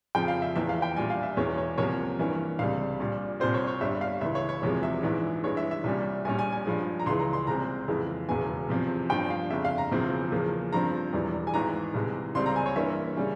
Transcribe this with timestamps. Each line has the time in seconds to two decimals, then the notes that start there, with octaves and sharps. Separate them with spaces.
0.15 F2 C#3 F3 G5
0.28 F5
0.42 E5
0.56 F1 E2 E3 E5
0.69 F5
0.82 G5
0.96 A#1 A#2 G3 G#5
1.10 F5
1.23 E5
1.37 E1 E2 E3 G#3 C#4 C#5
1.57 C#5
1.78 C2 C3 F3 A#3 C#4 C#5
2.19 G2 E3 A#3 C#4
2.59 C#2 C3 G3 F5
3.00 A#1 A#2 G3
3.40 C2 A#2 G3 C4 C5
3.54 C#5
3.67 C#5
3.81 G1 G2 G3 E5
4.01 F5
4.21 C#2 C#3 E3 E5
4.35 C#5
4.49 C#5
4.62 E1 E2 C3 F3 G#3 C#5
4.83 E5
5.03 A#1 G#2 E3
5.44 G2 E3 G#3 C#5
5.57 E5
5.71 E5
5.84 C2 A#2 G3 C#4
6.25 A#1 A#2 G3 C#4 G#5
6.39 G#5
6.52 G#5
6.66 G2 F3 G#3
7.00 A#5
7.06 C#2 C#3 E3 C6
7.20 A#5
7.33 C6
7.47 C2 A#2 G#3 C4 A#5
7.88 F2 C#3 E3 G#3
8.28 E1 E2 C#3 E3 G#5
8.69 E2 C3 F3 C4
9.10 G1 G2 F3 G5
9.30 F5
9.50 G1 F2 C#3 E5
9.65 F5
9.78 A#5
9.91 E1 E2 C#3 F3 C4
10.32 E2 C#3 F3 A#3
10.73 G2 F3 C4 A#5
11.13 E1 E2 E3 G3
11.47 G#5
11.54 G#1 G#2 E3 A#5
11.94 C2 C3 E3 G#3
12.35 C#2 C#3 G3 C4 C6
12.46 A#5
12.56 G#5
12.66 C#5
12.76 G2 E3 A#3 C#4 E5
13.17 C#3 G3 C#4